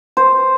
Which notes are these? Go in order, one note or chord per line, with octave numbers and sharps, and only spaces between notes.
C5